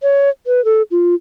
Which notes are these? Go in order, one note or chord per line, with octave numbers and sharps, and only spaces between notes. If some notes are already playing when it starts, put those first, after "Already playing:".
C#5
B4
A4
F4